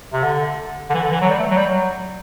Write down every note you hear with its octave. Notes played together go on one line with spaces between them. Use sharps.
C3
D3
D3
E3
D3
E3
F#3
G3
A3
F#3
G3
F#3